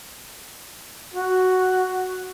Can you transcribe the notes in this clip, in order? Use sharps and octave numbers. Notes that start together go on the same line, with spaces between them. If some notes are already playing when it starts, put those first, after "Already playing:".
F#4